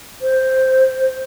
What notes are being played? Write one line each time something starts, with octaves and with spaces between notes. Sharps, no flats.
C5